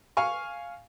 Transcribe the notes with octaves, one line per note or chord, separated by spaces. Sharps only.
F5 G#5 C#6